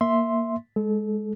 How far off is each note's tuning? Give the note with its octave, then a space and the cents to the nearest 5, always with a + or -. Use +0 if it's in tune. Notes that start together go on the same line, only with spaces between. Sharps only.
A#3 +0 E5 +0 C6 +0
G#3 +0 A4 -30